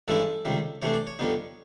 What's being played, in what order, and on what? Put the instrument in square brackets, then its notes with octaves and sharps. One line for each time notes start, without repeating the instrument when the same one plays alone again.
[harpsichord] G2 E3 G#3 C#4 E4 A4
C#2 C3 D#3 G3
C3 E3 A3 D4 C#5
D5
C#5
F2 D3 G3 B3 D#4